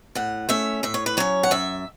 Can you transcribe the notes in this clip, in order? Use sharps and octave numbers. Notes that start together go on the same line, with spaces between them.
A2 F#5
A3 C#4 E5
A2 E5
C#5
B4
F#3 C#4 C#5
F#5
F#2 E5